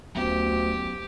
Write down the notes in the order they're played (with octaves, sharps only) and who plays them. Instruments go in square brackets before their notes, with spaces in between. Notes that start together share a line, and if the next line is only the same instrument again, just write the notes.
[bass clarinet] D2 [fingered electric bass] F#3 B3 C#4 [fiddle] G4